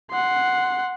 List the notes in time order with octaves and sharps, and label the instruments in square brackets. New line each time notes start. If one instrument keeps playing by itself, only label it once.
[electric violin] F#5 C6